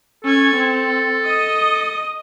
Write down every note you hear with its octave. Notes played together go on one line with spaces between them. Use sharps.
C#4 A4 G#6
C4
D#5 D#6